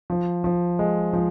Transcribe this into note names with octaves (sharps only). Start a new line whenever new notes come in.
F3
F3
G#3
F3